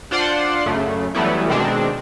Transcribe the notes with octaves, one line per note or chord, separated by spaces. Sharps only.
D4 F4 C5 D5 F#5 C6
F#2 C#3 A3
E3 F#3 G3 A3 B3 E4
B2 D#3 G#3 C4 D4